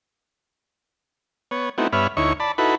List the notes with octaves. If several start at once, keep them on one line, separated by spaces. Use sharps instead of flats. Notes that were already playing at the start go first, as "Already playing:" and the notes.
B3 C#5
A3 B3 C4 D#4 E4 F#4
G2 B3 C#5 E5 B5 F6
D2 D#4 E4 C#5 C#6
D5 A5 B5
D#4 E4 F#4 A4 B4 B5